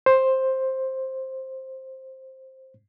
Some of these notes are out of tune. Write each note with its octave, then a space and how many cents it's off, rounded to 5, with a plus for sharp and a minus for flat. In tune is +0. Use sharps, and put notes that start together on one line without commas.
C5 +10